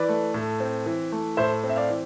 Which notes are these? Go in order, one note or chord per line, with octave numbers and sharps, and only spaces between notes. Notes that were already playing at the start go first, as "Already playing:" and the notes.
Already playing: E3 B4 D5
A3
A2
C4
E3
A3
A2 C5 E5
C4
E5
D5 F5
E3